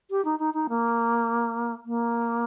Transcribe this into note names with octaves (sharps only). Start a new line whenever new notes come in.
G4
D#4
D#4
D#4
A#3
A#3